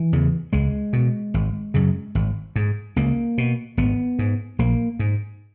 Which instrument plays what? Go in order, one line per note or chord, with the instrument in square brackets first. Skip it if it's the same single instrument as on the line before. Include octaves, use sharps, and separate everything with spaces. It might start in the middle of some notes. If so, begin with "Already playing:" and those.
Already playing: [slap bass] E3
E2 C#3
C#2 G#3
B2
G#1
F#2 C#3
G#1
G#2
C#2 A#3
B2
G#1 B3
G#2
A#1 A#3
G#2